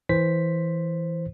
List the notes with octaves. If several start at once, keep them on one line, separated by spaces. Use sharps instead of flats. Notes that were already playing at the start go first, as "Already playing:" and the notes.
E3 C5 B6